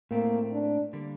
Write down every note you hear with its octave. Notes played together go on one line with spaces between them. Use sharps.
A2 A3 A#3 C4
D4
D3 G3 A#3